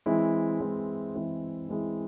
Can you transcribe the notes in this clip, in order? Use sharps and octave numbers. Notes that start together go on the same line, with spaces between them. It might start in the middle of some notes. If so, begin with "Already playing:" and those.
E3 G#3 C4 E4
E3 G#3 C4 E4
E3 G#3 C4 E4
E3 G#3 C4 E4